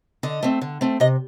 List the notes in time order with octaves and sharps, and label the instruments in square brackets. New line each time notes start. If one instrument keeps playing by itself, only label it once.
[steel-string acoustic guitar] D3 D#5
A3 C4
D3
A3 C4
C3 D#5